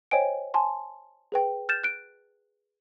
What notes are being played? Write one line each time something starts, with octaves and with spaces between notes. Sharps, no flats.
C5 C#5 D#5 G5 G#5 D7
G#5 A5 C6
G#4 B4 G5
F6 G6 A6 E7
F#6 D7